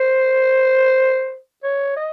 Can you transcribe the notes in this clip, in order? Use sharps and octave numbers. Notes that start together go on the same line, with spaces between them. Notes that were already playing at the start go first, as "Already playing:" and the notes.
Already playing: C5
C#5
D#5